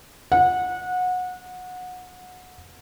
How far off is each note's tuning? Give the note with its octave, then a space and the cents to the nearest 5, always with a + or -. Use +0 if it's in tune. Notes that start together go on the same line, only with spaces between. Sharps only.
F#5 -25